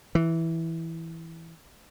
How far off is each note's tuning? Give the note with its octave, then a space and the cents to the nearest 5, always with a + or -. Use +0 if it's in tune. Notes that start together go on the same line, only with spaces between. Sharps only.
E3 -5